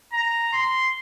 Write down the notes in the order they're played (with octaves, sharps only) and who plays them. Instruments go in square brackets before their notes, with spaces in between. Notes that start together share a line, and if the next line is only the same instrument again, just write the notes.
[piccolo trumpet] A#5
C6